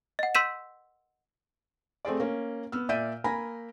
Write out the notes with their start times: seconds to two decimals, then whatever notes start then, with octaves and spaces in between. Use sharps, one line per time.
0.19 D#5 F#5
0.35 C6 E6 G6 B6 D#7 E7
2.05 A3 C4 G#4 D5
2.20 A#3 C#4
2.72 B3 E6 F6
2.89 A#2 D5 E5 G6 D#7
3.24 A#3 G#5 A#5 B5 A#6